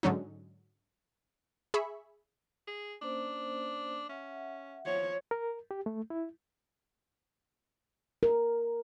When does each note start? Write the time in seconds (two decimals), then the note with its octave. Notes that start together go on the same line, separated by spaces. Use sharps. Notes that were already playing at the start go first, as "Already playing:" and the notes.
0.03 G#2 D3 F#3 C#4 D#4
1.74 G#4 E5 B5 C#6
2.67 G#4
3.02 A#3 C#4 D4 C5
4.09 C#4 E5 F#5
4.86 F3 C#5
5.31 A#4
5.71 G4
5.86 A3
6.10 E4
8.23 A#4